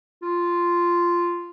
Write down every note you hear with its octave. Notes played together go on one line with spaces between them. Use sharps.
F4